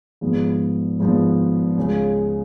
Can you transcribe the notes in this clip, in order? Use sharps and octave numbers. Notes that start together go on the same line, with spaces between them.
G#1 G#2 F3 G#3 B3
G#1 G#2 F3 G#3 B3
C#2 C#3 G#3